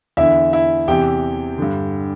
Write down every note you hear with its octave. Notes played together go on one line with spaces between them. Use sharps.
E2 D3 E4 E5
E4 E5
E2 C3 E3 G4 G5
G2 D3